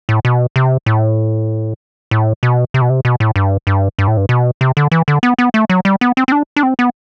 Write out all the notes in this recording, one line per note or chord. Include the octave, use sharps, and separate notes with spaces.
A2
B2
C3
A2
A2
B2
C3
B2
C3
B2
A2
G2
G2
G2
A2
G2
B2
C3
D3
E3
D3
B3
B3
A3
F#3
G3
B3
C4
C4
D4
D4
C4
B3